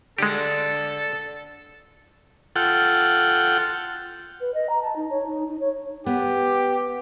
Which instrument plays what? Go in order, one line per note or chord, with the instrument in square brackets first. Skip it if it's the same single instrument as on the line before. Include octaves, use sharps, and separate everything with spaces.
[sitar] D3 [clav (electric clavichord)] G#3 G4 [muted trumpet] A4
[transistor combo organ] F4 A4 F#5 G5
[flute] B4
D#5
A#5
A5
D#4
C#5
D#4
D#4
C#5
[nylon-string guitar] B3 [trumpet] G4